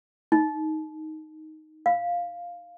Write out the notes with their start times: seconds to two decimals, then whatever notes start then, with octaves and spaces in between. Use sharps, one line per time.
0.32 D#4
1.86 F5